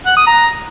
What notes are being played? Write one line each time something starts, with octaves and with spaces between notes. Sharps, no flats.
F#5
D#6
A#5